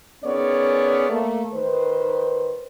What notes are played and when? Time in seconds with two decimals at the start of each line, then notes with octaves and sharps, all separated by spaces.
0.24 D#3 B3 C#4 G#4 C#5 D5
1.10 A3 A#3
1.53 D#3 B4 C5